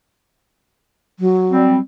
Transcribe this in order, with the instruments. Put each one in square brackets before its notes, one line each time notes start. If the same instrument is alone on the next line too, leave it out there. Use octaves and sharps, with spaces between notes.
[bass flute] F#3
[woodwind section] G3 C4